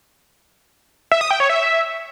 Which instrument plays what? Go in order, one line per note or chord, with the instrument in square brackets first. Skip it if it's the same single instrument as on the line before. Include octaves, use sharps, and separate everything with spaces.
[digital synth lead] E5
D#6
G5
C#5
E5